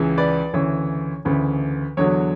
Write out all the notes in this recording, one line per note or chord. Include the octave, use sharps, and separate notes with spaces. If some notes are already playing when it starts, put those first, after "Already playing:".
Already playing: C#2 C#3 E3
B4 D5
D2 C#3 E3 C#5
D2 C#3 E3 B4
E2 D3 F#3 C#5